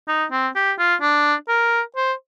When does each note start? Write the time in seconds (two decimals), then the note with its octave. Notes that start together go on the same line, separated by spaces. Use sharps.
0.08 D#4
0.32 C4
0.56 G4
0.79 F4
1.02 D4
1.49 A#4
1.96 C5